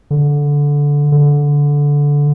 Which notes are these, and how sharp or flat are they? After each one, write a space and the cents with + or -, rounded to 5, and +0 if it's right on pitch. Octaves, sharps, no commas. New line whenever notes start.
D3 -15
D3 -15